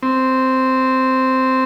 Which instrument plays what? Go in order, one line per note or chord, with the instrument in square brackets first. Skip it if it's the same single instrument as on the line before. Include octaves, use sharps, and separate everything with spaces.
[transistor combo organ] C4